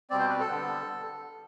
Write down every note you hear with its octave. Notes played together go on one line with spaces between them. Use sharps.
B2 G3 C4 D5
C5
B4
A4
D3 G3 B3